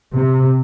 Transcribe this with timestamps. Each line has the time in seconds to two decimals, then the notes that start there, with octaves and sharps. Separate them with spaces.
0.14 C3